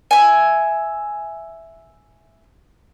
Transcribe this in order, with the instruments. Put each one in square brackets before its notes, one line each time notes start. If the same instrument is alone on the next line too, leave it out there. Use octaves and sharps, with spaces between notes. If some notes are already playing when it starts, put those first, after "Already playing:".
[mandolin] E5 G#5